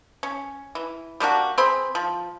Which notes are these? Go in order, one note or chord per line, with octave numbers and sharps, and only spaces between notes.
C#4
E3
G3 A#3 D4 F#4
C4 G#4 C5 B5
F3